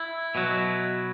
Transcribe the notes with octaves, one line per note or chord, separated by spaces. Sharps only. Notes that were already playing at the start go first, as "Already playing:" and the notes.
Already playing: E4
B2 F#3